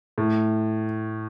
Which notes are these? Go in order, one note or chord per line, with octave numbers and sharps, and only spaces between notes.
A2